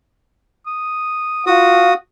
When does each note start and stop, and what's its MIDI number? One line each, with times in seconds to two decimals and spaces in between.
0.66 1.44 87
1.47 1.92 65
1.47 1.94 66
1.47 1.92 77
1.47 1.94 87